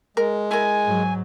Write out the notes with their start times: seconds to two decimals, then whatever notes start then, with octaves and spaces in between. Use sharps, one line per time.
0.17 G#3 A#4
0.51 E4 A#4 G#5
0.85 G#2 F#3